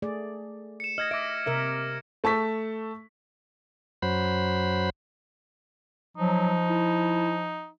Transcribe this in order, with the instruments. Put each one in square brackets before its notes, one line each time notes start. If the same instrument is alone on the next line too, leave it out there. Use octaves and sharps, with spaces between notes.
[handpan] A3 G#4 D5
[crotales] C#7 E7
[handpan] D#5 [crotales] F6 G#6 A#6
[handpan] E5 [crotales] D6 D7
[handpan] C3 A#4 E5
[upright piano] A3 A5 C#6 B6
[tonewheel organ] F#2 F#3 C5 B5
[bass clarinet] F3 [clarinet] F#3 [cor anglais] D#4
[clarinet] E4